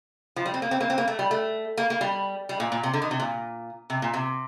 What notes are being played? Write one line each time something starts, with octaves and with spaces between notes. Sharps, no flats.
F3
G3
C4
A#3
C4
A#3
C4
A#3
A3
G3
A3
A#3
A#3
G3
G3
A#2
A#2
C3
D3
D#3
C3
A#2
C3
A#2
C3